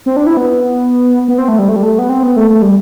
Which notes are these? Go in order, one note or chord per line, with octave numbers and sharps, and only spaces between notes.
C4
D4
E4
B3
B3
C4
A3
G3
A3
G3
A3
B3
C4
B3
A3
A3
G3